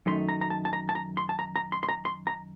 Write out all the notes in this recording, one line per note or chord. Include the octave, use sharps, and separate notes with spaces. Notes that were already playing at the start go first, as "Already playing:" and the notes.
F#2 D#3 A3 D#4 C6
A#5
A#5
A5
A5
A#5
A5
A#5
C6
A5
A#5
A#5
C6
C6
A#5
C6
A#5